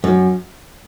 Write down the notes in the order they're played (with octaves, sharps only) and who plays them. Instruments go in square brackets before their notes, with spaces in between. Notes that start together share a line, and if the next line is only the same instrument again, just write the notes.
[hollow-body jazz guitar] F#2